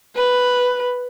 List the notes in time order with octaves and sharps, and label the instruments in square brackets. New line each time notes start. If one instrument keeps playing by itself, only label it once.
[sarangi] B4